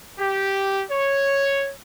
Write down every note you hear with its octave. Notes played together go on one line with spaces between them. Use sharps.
G4
C#5